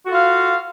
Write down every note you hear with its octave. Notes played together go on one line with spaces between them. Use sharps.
F4 F#4 A4 F5